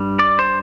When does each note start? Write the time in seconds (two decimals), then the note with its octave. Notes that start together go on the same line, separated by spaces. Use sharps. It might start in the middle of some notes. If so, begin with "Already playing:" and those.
Already playing: G2 G3 D4
0.19 D5
0.39 C5